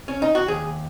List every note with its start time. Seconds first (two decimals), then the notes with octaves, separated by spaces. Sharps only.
0.08 C#4
0.22 D#4
0.35 F#4
0.48 D#2 G#4